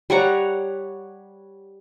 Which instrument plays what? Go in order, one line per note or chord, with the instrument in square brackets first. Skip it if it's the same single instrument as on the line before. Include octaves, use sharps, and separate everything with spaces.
[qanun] G3 C#5 F#5 A#5